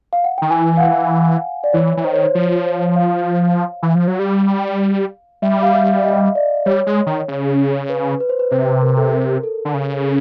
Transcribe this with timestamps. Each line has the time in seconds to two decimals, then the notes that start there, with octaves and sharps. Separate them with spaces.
0.13 F5
0.24 F#5
0.38 D#3 G5
0.50 E3 G#5
0.77 F5
0.80 F#5
1.64 D5
1.73 E3 C#5
1.97 E3
2.04 D#3 C5
2.14 C#5
2.23 C5
2.35 F3
2.96 F5
3.83 E3
3.95 F3
4.08 F#3
4.19 G3
5.42 G3 E5
5.63 F5
5.74 E5
6.04 D#5
6.35 D5
6.66 G3 C#5
6.87 G#3
7.06 D#3
7.28 C#3
7.89 B4
8.20 B4
8.29 C5
8.39 B4
8.51 C3 C5
8.66 B4
8.82 A#4
8.97 A4
9.13 A#4
9.43 A4
9.65 D3
9.74 C#3